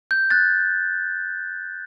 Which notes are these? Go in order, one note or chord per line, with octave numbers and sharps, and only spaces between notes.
G6
F#6 A6